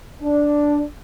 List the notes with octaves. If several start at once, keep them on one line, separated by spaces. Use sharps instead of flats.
D4